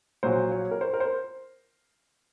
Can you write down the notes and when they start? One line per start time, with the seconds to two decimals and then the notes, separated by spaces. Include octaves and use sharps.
0.23 A#1 A#2 F#3 C5
0.52 C#5
0.71 A#4
0.81 C5
0.94 A#4
1.00 C5